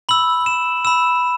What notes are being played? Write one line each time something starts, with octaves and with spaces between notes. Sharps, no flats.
B5 E6 F#7
E7
B5 E6 E7